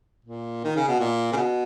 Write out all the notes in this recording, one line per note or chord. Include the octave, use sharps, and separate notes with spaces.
A#2
D#3
C#3
B2
A#2
C#3
B2